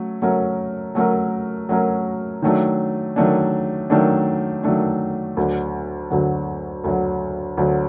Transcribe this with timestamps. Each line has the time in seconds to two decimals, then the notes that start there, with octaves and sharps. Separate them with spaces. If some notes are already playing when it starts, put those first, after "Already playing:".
Already playing: F#3 A3 C#4
0.22 F#3 A3 C#4 F#4 A#4
0.95 F#3 A3 C#4 F#4 A#4
1.69 F#3 A3 C#4 F#4 A#4
2.42 D#3 F#3 A3 D4
3.16 D#3 F#3 A3 D4
3.90 D#3 F#3 A3 D4
4.63 D#3 F#3 A3 D4
5.37 D2 D3 F#3
6.10 D2 D3 F#3
6.84 D2 D3 F#3
7.57 D2 D3 F#3